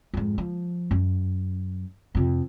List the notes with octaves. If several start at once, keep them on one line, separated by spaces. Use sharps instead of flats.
F2 G#2
F3
F#2
F2 C3